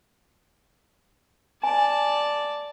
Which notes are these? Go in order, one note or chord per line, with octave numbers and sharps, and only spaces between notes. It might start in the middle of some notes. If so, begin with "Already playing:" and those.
D5 G#5 A5